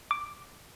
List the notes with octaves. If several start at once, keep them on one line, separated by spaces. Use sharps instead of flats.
D6